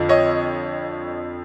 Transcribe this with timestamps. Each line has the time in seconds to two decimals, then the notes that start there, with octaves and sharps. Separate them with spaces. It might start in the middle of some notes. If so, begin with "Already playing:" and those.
Already playing: F2 D3 F3
0.09 C#5 D#5